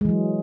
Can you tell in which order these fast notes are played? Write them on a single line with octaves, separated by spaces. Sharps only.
G#3 E3 F#3